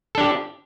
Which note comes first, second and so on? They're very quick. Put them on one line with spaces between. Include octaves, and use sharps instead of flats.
A4 D4 G4